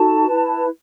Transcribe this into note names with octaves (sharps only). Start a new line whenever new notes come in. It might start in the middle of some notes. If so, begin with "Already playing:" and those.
Already playing: D#4 F#4 A4 A5
E4 B4